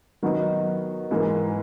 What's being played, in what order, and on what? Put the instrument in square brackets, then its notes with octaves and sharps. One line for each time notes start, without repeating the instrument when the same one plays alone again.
[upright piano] D#3 F#3 B3 D#4
G#2 E3 A#3